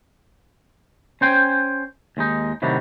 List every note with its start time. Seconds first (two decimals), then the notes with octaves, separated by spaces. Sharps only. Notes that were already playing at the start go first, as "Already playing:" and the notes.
1.21 C#4 C5 G5 G#5
2.17 D#2 G#3 D#4
2.62 A2 C3 D#3 F#3 G3 F#4